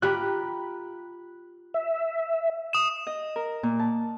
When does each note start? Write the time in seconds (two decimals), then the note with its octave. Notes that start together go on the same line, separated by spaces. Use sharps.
0.02 F4 G4 A#5 B5 F#6
1.74 E5
2.73 D#6 E7
3.07 D#5
3.36 A#4
3.63 A#2
3.79 A5